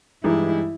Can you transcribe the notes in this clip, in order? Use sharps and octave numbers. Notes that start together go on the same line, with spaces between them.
G2 E3 G#3 D#4 E4